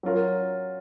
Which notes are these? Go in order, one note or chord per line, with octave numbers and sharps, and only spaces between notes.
F#3 C#4 F4 A#4